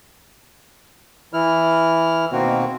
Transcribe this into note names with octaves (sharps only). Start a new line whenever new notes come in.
E3 E4 F6
B2 D#3 A#3 C4 F#4